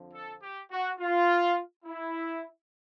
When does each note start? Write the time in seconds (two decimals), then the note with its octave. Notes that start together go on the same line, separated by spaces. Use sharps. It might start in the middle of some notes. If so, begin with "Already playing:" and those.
Already playing: F2 D3 F3
0.14 A4
0.42 G4
0.71 F#4
0.99 F4
1.85 E4